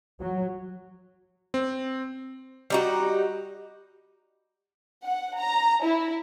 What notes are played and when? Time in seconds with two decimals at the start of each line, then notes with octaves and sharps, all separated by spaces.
0.21 F#3
1.54 C4
2.70 G3 D#4 F#4
5.06 F#5
5.39 A#5
5.84 E4